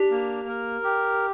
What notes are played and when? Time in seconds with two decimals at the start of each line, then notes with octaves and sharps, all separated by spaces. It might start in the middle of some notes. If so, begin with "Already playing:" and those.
Already playing: D4 G4
0.11 A#3
0.48 A#4
0.84 G4